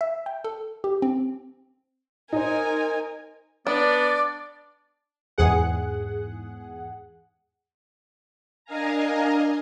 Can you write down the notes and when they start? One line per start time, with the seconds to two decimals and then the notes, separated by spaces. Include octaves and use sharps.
0.01 E5
0.26 G5
0.44 A4
0.84 G4
1.02 C4
2.33 D#4 A#4 C5 G#5
3.67 B3 D4 D5
5.38 E2 G#2 G#4 F#5
8.65 D4 A#4 D#5 F5 G#5 A#5